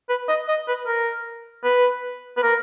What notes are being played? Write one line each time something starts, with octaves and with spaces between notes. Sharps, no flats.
B4
D#5
D#5
B4
A#4
B4
B4
A#4